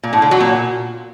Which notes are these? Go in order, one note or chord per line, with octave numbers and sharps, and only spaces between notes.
A#2
A2
D3
F#3
A#2